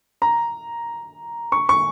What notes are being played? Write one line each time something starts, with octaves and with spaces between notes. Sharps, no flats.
A#5
C#6
C#6